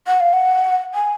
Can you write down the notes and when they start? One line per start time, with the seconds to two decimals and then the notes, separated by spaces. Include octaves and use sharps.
0.07 F#5
0.20 F5
0.33 F#5
0.94 G#5